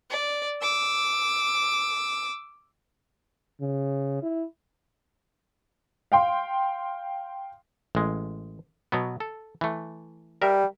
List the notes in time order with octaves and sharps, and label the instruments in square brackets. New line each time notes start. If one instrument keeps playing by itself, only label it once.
[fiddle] D5
D6 E6
[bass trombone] C#3
E4
[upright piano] F5 G5 C6
[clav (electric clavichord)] A1 G#3
B2 F#3 B3
A4
E3 A3
[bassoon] G3 [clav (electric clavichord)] A#4 E5